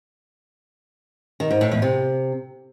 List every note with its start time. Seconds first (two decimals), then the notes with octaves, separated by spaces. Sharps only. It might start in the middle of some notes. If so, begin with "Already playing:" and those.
1.40 D#3
1.50 G#2
1.61 A2
1.71 E2
1.82 C3